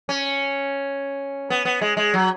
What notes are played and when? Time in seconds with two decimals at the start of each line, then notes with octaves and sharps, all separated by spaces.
0.09 C#4
1.50 B3
1.65 B3
1.81 G#3
1.97 G#3
2.14 F#3